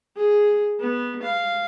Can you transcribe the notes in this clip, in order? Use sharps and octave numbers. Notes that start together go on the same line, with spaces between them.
G#4
B3
F5